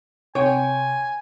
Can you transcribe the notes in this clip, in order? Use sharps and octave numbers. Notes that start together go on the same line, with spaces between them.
C3 C#5 G5 G#5